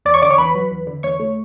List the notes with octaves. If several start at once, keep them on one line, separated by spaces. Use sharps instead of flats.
E2 D5 D6
C#5 C#6
D3 D5 D6
C#5 C#6
E2 B4 B5
F#3
E2
D3
E2 C#5 C#6
A3